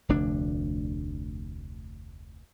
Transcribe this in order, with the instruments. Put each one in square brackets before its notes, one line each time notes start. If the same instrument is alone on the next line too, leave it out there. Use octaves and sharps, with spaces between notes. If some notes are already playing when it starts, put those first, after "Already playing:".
[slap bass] F1 D2 D4